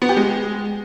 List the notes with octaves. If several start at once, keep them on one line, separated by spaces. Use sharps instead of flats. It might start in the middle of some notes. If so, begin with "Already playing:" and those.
B3
G4
G#3